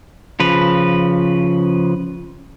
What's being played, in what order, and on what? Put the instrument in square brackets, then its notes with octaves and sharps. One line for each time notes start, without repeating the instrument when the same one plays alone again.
[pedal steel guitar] C#3 F3 B4